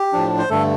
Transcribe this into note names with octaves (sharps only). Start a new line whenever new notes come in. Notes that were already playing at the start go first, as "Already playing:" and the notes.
Already playing: G4
A2 F3 D4
C5
G2 D3 A3 A4